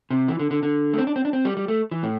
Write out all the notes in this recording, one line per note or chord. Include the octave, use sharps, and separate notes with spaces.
C3
E3
D3
D3
D3
A3
C4
D4
C4
D4
C4
G3
G3
A3
E3
A2